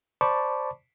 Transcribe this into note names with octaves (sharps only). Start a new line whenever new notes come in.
C5 D5 A5 B5 C#6 D6